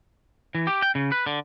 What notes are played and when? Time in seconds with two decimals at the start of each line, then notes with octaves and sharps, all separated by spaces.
0.55 E3
0.67 G4
0.82 G5
0.95 C#3
1.12 B4
1.26 D3